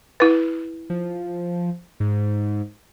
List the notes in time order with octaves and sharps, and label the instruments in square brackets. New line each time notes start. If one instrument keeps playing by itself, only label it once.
[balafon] E4 B4
[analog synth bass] F3
G#2